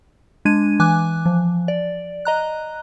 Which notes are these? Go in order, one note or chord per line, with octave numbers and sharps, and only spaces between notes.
G#3 D4 G#6 D#7
E3 G#5 D6 F#6
F3
D5
D#5 A#5 F#6